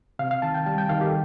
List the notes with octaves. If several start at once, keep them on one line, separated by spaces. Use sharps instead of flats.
C3 F5
F5
D#3 A5
G5
G3 A5
G5
D#3 F5
G4
A4